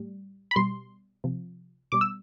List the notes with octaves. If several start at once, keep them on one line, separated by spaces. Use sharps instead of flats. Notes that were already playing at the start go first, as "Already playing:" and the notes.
Already playing: A2 G3
B5
B2 G3 C6
C3 F3
B2 G3 D6
E6